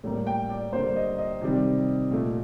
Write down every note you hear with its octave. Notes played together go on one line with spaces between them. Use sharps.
A2 G3 A#3
G5
D5
D3 G3 A#3 C5
D#5
D#5
C3 D#3 G3
A#2 A3